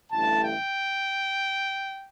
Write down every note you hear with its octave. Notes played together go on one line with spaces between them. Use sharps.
A1 G2 D3 A3 E4 A5
G5